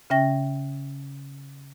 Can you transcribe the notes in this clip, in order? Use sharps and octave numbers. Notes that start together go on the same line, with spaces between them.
C#3 C#4 E5 G5 A#6